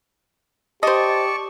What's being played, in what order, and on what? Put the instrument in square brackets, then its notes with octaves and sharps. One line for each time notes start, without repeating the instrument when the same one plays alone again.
[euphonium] G4 [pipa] C5 D#5 [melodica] D5 A5 C#6